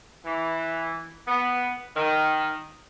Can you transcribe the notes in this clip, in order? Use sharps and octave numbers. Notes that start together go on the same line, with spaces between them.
E3
B3
D#3